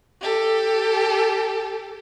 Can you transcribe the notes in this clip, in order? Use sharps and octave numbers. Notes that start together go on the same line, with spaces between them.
G4 A4